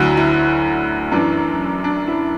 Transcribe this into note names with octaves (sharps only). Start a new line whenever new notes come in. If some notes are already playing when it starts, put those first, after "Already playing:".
Already playing: D2 D3 F#3 E4 F#4
E4
F#2 E3 D4
D4
E4